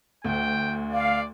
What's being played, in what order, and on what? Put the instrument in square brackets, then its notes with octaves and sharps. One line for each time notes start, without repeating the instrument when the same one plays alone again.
[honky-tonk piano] D2 [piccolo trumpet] G5
[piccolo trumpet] D5 [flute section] F5